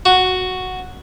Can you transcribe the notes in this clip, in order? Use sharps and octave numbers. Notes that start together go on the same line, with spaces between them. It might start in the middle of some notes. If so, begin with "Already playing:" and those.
F#4